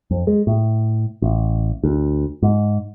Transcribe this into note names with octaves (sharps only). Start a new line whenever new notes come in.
F2
G#3
A2
A1
D2
G#2